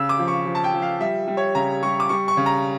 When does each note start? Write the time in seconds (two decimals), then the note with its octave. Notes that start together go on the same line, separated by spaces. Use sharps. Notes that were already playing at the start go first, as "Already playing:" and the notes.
Already playing: C#3 E6
0.09 D6
0.19 F3
0.28 C#6
0.46 F3
0.55 A5
0.64 G5
0.73 F3
0.82 F5
1.00 G3 E5
1.28 G3
1.37 C#5
1.55 C#3 A#5
1.83 G3 C#6
2.00 D6
2.09 G3 C#6
2.28 C#6
2.37 C#3
2.46 A#5